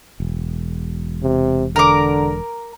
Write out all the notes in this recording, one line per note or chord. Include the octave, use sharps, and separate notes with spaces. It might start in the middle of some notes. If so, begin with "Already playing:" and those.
E1
C3
D3 A#4 D6